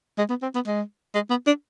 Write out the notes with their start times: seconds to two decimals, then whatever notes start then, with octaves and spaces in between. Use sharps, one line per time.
0.18 G#3
0.29 B3
0.42 C4
0.55 B3
0.67 G#3
1.15 G#3
1.30 B3
1.47 D4